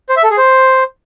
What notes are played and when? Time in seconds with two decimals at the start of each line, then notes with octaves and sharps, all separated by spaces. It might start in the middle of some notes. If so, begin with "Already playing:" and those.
0.09 C5
0.16 E5
0.23 A4
0.30 G#4
0.37 C5